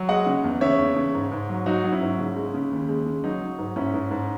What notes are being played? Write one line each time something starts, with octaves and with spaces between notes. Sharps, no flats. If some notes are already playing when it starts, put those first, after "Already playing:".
Already playing: F#3
G#3 D#5 F#5
C#3
E2
C#3 C#5 E5
E2
C#3
G#2
G#2
F#3
F#3 D#4 F#4
F#3
C#4 E4
G#2
C#3
G#3
C#3
D#2
G#3
C#3
F#3 D#4
F#3
G#2
G#2 C#4 E4
G#2
G#2